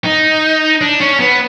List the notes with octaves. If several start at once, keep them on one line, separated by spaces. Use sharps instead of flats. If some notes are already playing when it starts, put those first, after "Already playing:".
D#4
D4
C#4
B3